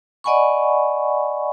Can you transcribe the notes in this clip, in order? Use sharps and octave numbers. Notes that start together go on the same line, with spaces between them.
D5 D#5 F#5 G#5 B5 C#6